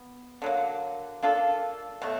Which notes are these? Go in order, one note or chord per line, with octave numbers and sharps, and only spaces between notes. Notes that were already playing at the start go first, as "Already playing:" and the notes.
Already playing: B3
D3 F#3 A#3
A#3 D4 F4 A4
B2 F#3 A3